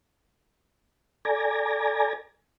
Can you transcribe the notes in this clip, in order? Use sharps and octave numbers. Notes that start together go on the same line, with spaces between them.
A4 D5 G#5 A#5